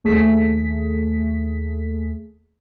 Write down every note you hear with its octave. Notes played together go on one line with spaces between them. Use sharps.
D#2 A3 G#4 B6